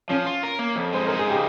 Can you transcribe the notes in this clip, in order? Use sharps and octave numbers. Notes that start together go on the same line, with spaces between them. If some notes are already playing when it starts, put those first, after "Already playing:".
F3 C#4
F4
A#4
A#3
F2
G#3 C5
D#4 A#4
G#4
C#3 G4